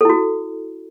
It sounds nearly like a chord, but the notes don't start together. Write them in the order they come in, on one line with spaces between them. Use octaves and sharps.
A4 E4 F#4